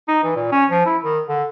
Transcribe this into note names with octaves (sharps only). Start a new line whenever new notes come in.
D#4
E3
A#2
C#4
F3
E4
D#3
D3